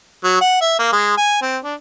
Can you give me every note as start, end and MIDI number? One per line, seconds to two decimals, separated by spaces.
0.24 0.38 54
0.41 0.60 78
0.61 0.79 76
0.79 0.91 58
0.92 1.16 56
1.17 1.39 80
1.42 1.58 60
1.64 1.74 62